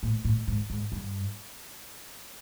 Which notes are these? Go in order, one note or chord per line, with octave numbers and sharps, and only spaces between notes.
A2
A2
G#2
G#2
G2